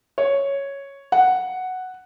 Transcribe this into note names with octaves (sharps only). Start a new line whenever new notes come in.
C#5
F#5